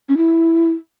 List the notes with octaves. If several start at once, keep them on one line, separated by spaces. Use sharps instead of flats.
C#4
E4